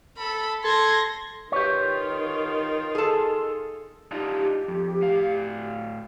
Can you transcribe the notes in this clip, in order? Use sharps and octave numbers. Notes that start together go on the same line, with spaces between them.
A4 B5
A4 C6 G#6 A#6
D#3 F4 G4 B4 C#5
G#4 A4
D4 D#4 F4 G4
F2
A2 F5